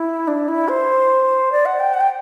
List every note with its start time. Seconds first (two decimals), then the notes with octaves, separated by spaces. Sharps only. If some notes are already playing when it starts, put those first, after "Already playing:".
Already playing: E4
0.27 D4
0.48 E4
0.68 C5
1.52 D5
1.65 F#5
1.79 G5
1.94 F#5
2.00 G5